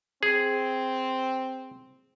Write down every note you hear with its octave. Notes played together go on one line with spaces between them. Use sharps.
C4 G#4